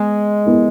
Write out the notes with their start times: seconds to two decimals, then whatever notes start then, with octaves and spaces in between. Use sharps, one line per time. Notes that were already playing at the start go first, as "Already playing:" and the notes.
Already playing: G#3 B3
0.45 B3 E4 A#4